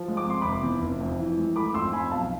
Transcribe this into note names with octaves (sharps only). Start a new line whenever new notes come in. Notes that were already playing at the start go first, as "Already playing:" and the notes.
Already playing: F3
G#3
D6
C4 C6
F1 B5 D6
E2
F1
F2
E3
G#3
A3 B5 D6
F2 C6 E6
F2 G#5 B5
B1 F5 A5